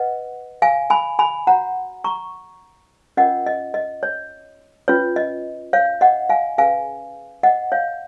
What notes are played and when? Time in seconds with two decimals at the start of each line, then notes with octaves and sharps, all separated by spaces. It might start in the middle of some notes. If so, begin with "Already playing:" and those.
Already playing: B4 D#5 F#5
0.62 F5 G#5
0.90 G#5 B5
1.19 G#5 B5
1.47 F#4 C#5 F#5 A#5
2.04 A#5 C#6
3.17 C#4 F4 A#4 C#5 D#5 F#5
3.47 D#5
3.74 D#5
4.03 C#5
4.88 C#4 F4 B4 C#5
5.16 D#5
5.73 C#5 F5
6.01 D#5 F#5
6.29 F5 G#5
6.58 C#4 G#4 B4 F5 G#5
7.43 D#5 F#5
7.72 C#5 F5